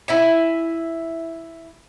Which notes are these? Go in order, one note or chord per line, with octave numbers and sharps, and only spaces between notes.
E4 E5 G#5